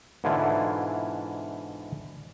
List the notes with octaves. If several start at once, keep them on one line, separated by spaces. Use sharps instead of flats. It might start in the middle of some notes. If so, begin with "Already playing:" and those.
G#2 B2 D3 E3 E4 F4